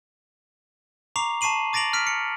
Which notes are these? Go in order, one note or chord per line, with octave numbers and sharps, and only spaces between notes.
A#5 C#6 D6 C7 F7
A5 C#6 C7 D#7 F#7
D6 A6 A#6 D7 F7 F#7
F6 B6 D7
C#7